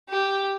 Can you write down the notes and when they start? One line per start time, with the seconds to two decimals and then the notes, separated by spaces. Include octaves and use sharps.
0.09 G4